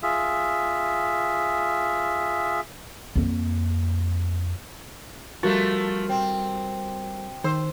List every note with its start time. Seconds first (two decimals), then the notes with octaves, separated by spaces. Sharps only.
0.03 F4 G#4 E5
3.16 F2 A#3
5.43 F3 G3 A3 F#4 A#4 G6 A6
6.09 C4 G5
7.44 D#3 C5 E6